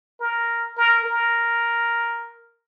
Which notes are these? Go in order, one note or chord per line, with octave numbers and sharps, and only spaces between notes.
A#4
A#4
A#4